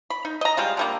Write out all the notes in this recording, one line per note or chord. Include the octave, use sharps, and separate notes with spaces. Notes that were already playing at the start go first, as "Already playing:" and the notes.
B5
D#4
D#5 A#5
G3 G#3 F4
D3 G3 A#3